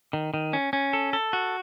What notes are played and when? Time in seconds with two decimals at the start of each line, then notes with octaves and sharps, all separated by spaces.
0.13 D#3
0.34 D#3
0.53 C#4
0.73 C#4
0.93 A4
1.13 A4
1.33 F#4